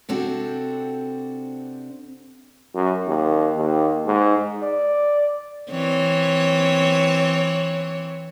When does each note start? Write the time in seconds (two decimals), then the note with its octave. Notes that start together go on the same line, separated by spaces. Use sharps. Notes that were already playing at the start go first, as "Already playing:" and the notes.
0.09 C3 C4 D4 F#4 A4
2.75 F#2
3.07 D#2
3.57 D#2
4.06 G#2
4.62 D5
5.71 E3 C4 C#5